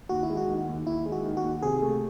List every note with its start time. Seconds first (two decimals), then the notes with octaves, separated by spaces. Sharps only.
0.09 D#2 F#4
0.23 E4
0.29 G#3
0.37 F#4
0.48 D#3
0.67 D#2
0.86 D#2 E4
1.05 G#3
1.12 F#4
1.24 D#3
1.37 F#4
1.43 D#2
1.62 C3 G#4
1.81 A3